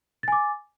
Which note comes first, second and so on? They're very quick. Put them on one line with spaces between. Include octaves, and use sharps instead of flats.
A6 G#5 D6